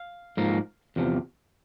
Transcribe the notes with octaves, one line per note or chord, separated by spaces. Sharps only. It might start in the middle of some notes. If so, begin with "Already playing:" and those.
Already playing: F5
G#2 F3 A#3
E2 C3 F3